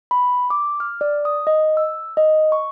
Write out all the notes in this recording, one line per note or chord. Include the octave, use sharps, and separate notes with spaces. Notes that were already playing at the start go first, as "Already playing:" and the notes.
B5
D6
F6
D5
D#6
D#5
E6
D#5
C#6